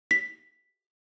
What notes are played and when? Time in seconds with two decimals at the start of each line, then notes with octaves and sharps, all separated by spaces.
0.11 B6